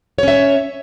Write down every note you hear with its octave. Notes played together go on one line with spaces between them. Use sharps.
C#4 C#5 E5